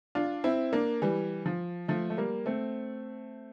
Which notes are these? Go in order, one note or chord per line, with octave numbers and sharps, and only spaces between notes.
D4 F4
C4 E4
A#3 D4
E3 G3
F3
F3 A3
A3
G3 A#3
A3 C4